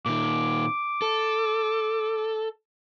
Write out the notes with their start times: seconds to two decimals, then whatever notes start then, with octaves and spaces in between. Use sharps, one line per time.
0.06 A#2 D#3 D6
1.02 A4